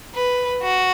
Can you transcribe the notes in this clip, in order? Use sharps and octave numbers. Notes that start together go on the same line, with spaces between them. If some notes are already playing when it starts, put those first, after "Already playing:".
B4
F#4